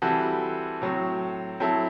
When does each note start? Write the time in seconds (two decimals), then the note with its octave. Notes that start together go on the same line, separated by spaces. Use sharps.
0.02 E3 G3 C4 F#4 A4
0.82 A2 F#3 C4
1.60 F#3 C4 E4 A4